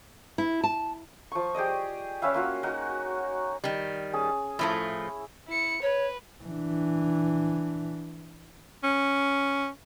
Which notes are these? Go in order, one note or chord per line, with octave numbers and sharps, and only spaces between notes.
E4
A5
F3 C#6
G4 G#4 D5 D#5
C#4 B4 E5 F5
A#3 F4 F#4
D#4 F#4 A#4 D#5
D#3 G3
C#4 G#4 A5
A2 F3 A3 E4
E4 C#7
B4 C#5
E3 D4
C#4